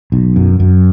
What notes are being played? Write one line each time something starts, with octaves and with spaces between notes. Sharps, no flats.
B1
F#2
F#2